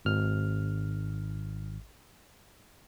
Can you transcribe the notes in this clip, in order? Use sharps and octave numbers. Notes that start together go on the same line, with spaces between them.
G#1 F6